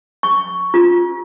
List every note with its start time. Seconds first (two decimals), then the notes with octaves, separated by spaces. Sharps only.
0.23 C#6
0.74 F4